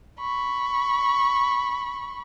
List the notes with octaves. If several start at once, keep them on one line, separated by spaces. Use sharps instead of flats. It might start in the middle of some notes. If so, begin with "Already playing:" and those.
B5 C#6